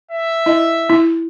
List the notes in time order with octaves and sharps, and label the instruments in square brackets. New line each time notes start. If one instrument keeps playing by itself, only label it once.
[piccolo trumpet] E5
[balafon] E4 D#5
E4